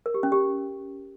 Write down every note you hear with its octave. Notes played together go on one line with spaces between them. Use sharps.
A#4
G4
C#4
G4